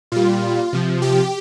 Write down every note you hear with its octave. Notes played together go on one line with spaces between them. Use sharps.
A#2 G3 F4
C3 F3
G4